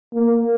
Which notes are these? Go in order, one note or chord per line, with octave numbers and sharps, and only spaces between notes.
A#3